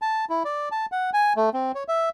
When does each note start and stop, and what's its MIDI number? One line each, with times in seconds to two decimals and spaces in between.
0.02 0.25 81
0.30 0.43 64
0.45 0.69 74
0.71 0.86 81
0.92 1.10 78
1.13 1.33 80
1.36 1.50 57
1.54 1.72 60
1.75 1.84 73
1.88 2.09 76